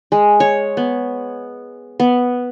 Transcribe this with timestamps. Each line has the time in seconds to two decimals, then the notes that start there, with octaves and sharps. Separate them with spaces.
0.12 G#3
0.40 C#5
0.77 B3
2.00 B3